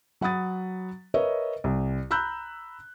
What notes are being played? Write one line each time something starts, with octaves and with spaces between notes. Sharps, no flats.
F#3 F#5 B5 D#6 A6
A#4 B4 C#5 D#5 E5
C2
A#5 B5 E6 F#6 G6